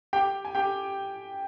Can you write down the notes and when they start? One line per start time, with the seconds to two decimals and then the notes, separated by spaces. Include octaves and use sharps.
0.13 G4 G5
0.45 G#5
0.55 G4 G5